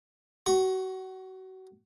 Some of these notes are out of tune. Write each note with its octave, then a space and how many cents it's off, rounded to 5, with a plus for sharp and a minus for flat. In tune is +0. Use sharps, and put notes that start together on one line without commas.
F#4 +30 C#6 -10